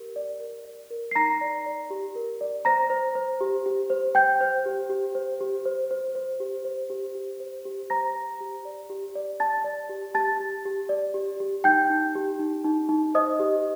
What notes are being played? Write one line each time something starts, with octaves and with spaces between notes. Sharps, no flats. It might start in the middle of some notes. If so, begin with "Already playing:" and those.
Already playing: G4 A#4
D5
A#4
D5
A#4
C7
D#4 A#5 A#6
D5
D5
G4
A#4
D5
C5 A#5 A#6
C5
C5
G4
G4
C5
C5 G5 G6
C5
G4
G4
C5
G4
C5
C5
C5
G4
C5
G4
G4
C5
G4
C5 A#5 A#6
C5
G4
D5
G4
D5
D5 A5 A6
D5
G4
G4 A5 A6
G4
G4
D5
G4
G4
D#4 G5 G6
D#4
G4
D#4
D#4
D#4
C5 D#5 D#6
G4